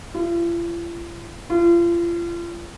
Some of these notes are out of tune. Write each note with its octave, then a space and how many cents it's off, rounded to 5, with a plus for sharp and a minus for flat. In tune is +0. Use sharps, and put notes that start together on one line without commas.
F4 -45
F4 -35